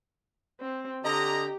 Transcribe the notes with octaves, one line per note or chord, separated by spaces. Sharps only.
C4
D3 G4 D#5 A#5